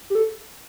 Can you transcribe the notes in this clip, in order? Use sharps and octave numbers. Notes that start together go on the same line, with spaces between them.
G4
A4